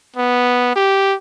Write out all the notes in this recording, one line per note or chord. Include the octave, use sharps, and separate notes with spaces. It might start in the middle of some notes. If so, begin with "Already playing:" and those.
B3
G4